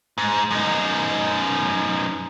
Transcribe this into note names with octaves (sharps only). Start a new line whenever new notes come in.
G#2
F#2 D#4